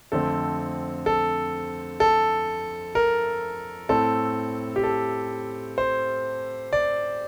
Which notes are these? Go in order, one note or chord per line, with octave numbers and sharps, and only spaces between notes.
F2 D3 A3 C4 A4
A4
A4
A#4
A2 A3 C4 A4
G4
A4
C5
D5